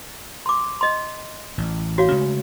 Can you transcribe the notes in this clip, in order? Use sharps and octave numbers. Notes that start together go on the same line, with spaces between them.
C6 D6
D#5 C6
A1
F#4 C#5 F5
C#3 G#3 A3